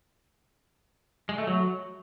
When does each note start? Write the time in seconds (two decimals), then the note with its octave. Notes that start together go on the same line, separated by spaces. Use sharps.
1.29 G#3
1.38 A3
1.47 F#3